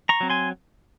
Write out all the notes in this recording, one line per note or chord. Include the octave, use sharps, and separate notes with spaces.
A#5 C#6
F#3 C4
G#5 C6